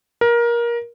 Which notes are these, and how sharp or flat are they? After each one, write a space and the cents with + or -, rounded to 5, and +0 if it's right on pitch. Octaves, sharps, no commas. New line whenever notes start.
A#4 +20